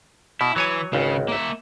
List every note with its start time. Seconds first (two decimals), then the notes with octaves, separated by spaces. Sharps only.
0.41 B2 E4
0.56 E3 F#3 C#5 G#5
0.93 G#1 C#2 C#3
1.28 A#3 E5